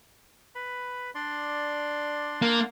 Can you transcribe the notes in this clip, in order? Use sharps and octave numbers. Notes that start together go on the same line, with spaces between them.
B4 B5
D4 D5 C6
A#3